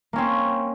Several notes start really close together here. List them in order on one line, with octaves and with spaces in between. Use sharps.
A#3 C#4 C4